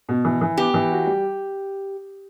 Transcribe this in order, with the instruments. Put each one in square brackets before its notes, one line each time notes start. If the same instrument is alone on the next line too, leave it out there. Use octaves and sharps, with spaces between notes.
[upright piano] B2
E3
E3
[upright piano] B3 [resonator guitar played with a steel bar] G4
[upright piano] E3
F#4
G3